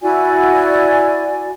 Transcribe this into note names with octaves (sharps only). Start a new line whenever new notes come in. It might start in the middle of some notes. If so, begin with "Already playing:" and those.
E4 F#4 D5 G#5